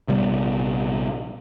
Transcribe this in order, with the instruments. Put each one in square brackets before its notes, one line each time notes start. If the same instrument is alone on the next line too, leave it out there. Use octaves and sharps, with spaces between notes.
[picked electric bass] A#1 C3 G3 B3